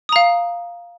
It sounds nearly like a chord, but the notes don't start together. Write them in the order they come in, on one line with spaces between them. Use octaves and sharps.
D#6 A#5 F5